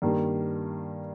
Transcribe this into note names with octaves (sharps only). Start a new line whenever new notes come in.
G2 D#3 G3 A#3 D4